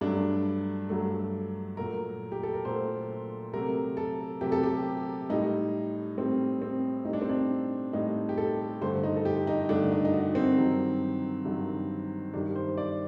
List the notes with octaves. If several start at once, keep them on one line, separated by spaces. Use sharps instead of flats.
G2 F#3 A3 D4
G2 F#3 A3
A#2 F#3 A3 A#4
G4
A4
A#4
A#2 F#3 A3 C5
C3 F#3 A3 A#4
A4
C3 F#3 A3 G4
A4
G4
A2 G3 D#4
A2 G3 C4
C4
A2 G3 D4 D#4
C4
D4
A2 G3 D#4
G4
A4
G2 D3 A3 C5
D#4
A4
G4
D#4
G2 D3 A3 D4
D#4
D#4
F#4
C4
G2 D#3 F#3
G2 D#3 F#3
G2 D#3 G3 D4
C5
D5